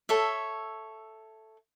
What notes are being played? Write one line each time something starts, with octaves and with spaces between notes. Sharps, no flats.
A4 C#5 E5